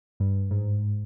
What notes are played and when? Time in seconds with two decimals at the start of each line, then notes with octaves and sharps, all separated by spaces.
0.20 G2
0.51 G#2